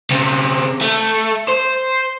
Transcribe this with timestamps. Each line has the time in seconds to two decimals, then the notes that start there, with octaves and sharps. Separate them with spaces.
0.11 C#3 C4
0.81 A3
1.48 C5